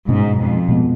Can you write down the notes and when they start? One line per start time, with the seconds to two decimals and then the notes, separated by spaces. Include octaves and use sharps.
0.09 G#2 B2 G#3 C#4
0.38 F2
0.69 B2 G#3 B3